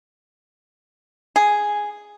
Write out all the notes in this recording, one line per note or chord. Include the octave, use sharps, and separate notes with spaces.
G#4